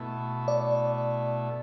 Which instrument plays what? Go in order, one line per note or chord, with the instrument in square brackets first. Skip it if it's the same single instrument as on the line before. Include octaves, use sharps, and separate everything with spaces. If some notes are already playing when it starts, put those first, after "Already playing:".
Already playing: [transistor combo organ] B2 A3 E4
[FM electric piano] D5